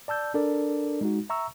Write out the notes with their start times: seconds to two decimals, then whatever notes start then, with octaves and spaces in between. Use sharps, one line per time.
0.08 D5 A5 E6 G6
0.34 D4 A4 A#4 D5
1.01 G#3 D#4 F#4
1.30 E5 A#5 C#6 E6